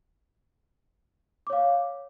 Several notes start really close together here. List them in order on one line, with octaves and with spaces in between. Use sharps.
D6 C#5 F5